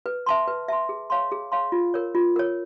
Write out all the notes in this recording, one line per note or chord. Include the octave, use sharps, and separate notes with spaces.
B4
E5 A5 C6
B4
E5 A5 C6
G#4
C#5 F5 A5 C6
G#4
C#5 F5 A5 C6
F4
A#4 C#5
F4
A#4 C#5